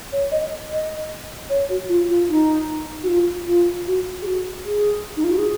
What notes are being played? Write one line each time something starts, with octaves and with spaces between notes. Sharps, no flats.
C#5
D#5
D#5
C#5
F#4
F4
F4
D#4
F#4
F4
F4
F#4
G#4
F#4
G#4
D#4
F4
F#4
G#4